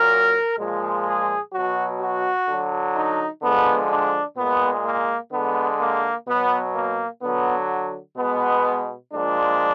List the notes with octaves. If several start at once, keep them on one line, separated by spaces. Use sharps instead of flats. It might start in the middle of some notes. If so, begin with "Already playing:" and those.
Already playing: A#2 F#3 A#4
A#2 F3 G#3
G#4
F#3 F#4
B2
F#4
D3 F#3
D#4
D3 F3 G#3 B3
D4
A#2 G#3 B3
A#3
D3 G#3 B3
A#3
B2 F#3 B3
A#3
D3 F#3 B3
B2 G#3 B3
A#2 F3 G#3 D4